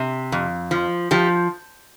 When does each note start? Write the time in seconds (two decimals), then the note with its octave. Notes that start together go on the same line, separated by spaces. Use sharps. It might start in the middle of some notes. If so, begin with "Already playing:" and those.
Already playing: C3
0.32 F2
0.71 F3
1.11 F3 G4